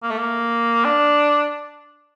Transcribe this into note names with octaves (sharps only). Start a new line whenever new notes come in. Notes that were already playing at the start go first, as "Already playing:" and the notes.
A#3
A3
A#3
D4